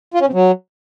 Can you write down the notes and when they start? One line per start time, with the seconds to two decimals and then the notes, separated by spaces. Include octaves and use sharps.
0.14 F4
0.20 C#4
0.27 C3
0.33 F#3